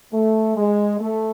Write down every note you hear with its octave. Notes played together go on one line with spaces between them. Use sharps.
A3
G#3
A3